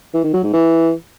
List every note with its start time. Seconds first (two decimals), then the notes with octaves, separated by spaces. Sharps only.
0.14 E3
0.23 D#3
0.33 F#3
0.43 G#2
0.53 E3